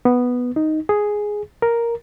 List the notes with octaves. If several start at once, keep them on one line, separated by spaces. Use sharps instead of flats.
B3
D#4
G#4
A#4